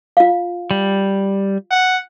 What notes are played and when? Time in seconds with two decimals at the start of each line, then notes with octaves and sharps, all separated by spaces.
0.17 F4 F5
0.71 G3
1.71 F#5